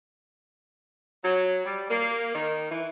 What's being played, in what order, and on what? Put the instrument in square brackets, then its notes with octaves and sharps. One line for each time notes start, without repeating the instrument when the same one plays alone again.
[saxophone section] F#3
G3
A#3
D#3
E3